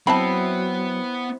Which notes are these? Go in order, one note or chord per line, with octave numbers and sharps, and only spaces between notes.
F#3 B3 C4 E4 A5 B5